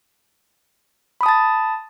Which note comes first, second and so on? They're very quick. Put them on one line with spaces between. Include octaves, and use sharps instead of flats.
B5 D#6 A5 A6